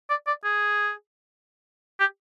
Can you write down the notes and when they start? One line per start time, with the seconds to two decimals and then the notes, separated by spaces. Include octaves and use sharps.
0.10 D5
0.27 D5
0.44 G#4
2.00 G4